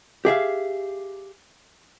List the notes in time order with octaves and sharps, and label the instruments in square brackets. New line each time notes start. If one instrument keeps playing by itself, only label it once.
[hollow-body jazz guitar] G4 G#4 E5 F5